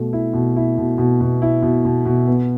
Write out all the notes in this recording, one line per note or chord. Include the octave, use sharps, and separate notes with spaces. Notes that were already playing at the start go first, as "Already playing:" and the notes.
Already playing: B2 A3
E4
B2
E4
B2
B2
B2
E4
B2
B2
B2
B3